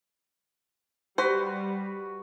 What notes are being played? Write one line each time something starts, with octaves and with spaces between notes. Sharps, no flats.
G3 F#4 B4 C5